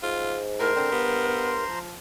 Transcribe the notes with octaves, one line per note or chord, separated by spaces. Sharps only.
G#2 F4
A2 A#4 C5 A#5 C6
D3 C4
G2 B3
F3